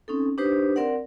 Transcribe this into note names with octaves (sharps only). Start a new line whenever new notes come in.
C4 C#4 D#4 A4
D4 D#4 G4 B4 C5
C4 A#4 D5 F#5